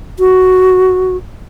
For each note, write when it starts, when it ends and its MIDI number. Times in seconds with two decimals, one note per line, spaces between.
0.19 1.17 66